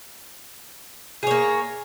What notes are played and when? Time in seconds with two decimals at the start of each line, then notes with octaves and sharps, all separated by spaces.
1.23 G#4
1.27 C#5
1.31 A#3